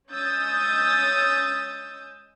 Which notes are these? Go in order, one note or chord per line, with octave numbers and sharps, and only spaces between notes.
G#3 C#4 D#6 E6 G6 A6